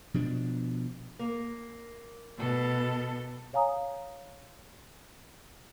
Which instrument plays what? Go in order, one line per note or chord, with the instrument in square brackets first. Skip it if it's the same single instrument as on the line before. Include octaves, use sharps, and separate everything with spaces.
[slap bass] B2 F3 D4
[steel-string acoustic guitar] A#3
[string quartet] B2 A4
[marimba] C#5 F5 G#5 A#5 D#6